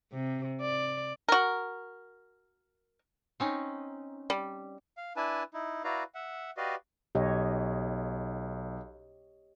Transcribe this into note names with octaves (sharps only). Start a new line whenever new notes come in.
C3
D5
F#4 A#4
C4 C#4 D#4
G3
F5
D4 E4 B4 G#5 A5
D#4 E4
E4 F#4 B4 D5 F5 A#5
E5 F#5
F#4 G4 B4 D5 D#5 F5
B1 G4 C#5 D#5